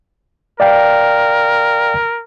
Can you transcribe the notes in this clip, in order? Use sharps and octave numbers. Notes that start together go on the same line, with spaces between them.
A#4 D5 F5 G5